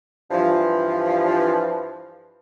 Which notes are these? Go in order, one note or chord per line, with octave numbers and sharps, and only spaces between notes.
G2 E3 F3